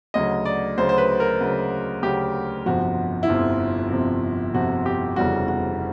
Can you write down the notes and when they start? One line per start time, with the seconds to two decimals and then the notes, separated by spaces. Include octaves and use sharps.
0.14 D2 C#3 F#3 D#5
0.45 D5
0.78 D2 C#3 F#3 C5
0.89 C5
0.98 B4
1.20 A#4
1.41 D2 C#3 F#3
2.03 D2 C#3 F#3 G4
2.66 G1 F2 C3 F3 F#4
3.23 E4
3.28 G1 F2 C3 F3 F4
3.91 G1 F2 C3 F3
4.53 G1 F2 C3 F3 F#4
4.86 G4
5.16 F1 E2 C#3 E3 G3 F#4
5.48 F#4